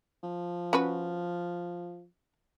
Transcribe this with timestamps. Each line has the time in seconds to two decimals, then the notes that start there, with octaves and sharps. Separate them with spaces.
0.23 F3
0.73 C#4 F#4 B4